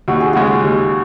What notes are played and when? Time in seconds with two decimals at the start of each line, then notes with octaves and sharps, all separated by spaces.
0.08 D#2 F#4
0.20 G#4
0.33 C#3 G#3 F#4
0.64 D#2